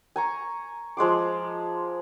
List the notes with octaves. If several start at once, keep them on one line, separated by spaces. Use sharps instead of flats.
G#5 A#5 C#6
F3 G#3 C6 D6